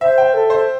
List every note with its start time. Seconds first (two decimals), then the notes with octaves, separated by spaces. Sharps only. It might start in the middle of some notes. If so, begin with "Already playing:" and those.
0.01 C5 E5
0.18 G5
0.34 A4
0.50 C5